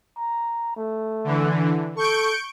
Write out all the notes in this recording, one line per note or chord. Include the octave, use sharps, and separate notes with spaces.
A#5
A3
D3 E3
A4 C#6 G6 D7